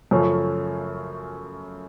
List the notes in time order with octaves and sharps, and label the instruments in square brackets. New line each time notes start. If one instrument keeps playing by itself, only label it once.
[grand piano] F#2 C#3 F3 A3 C#4